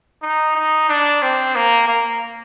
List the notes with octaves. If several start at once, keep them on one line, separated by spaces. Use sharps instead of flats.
D#4
D#4
D4
C4
A#3
A#3